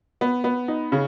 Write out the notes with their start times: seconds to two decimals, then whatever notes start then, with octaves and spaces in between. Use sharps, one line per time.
0.21 B3
0.44 B3
0.68 D#4
0.92 C#3